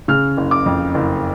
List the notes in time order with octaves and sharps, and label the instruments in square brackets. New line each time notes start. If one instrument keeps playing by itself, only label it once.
[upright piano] C#3 F6
F#1
D6
F2
F#1